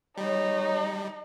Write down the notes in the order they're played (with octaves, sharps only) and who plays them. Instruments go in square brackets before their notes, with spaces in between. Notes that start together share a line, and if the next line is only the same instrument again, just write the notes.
[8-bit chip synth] G3 [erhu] D#4 [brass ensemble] C#5